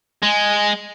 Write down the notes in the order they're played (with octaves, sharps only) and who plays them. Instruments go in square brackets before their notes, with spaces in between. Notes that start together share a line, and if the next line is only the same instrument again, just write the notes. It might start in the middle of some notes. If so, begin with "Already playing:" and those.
[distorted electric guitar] G#3